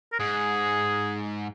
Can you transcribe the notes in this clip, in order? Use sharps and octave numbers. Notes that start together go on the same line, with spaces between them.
A#4
G#2 G#4